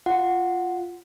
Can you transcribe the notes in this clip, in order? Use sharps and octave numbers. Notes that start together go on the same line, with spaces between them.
F4 F#5